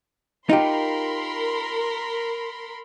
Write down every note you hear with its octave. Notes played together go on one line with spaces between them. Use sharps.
D#4 F4 G4 A#4 B5 C6